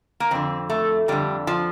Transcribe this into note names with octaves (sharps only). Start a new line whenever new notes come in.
A#3
F2 D3 C4
A3
F2 D3 G3
F3